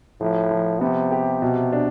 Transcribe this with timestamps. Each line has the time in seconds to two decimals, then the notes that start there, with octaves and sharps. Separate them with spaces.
0.21 A2 F3
0.51 F3
0.81 C3 B3
1.11 G4
1.42 B2
1.73 D4